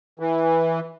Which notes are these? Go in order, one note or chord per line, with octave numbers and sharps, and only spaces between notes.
E3